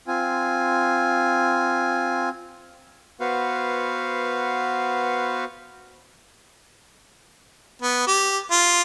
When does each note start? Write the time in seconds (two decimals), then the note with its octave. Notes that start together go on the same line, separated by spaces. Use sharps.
0.07 C4 F4 G#5
3.20 B3 F#4 B4 C5 F5
7.82 B3
8.07 G4
8.51 F4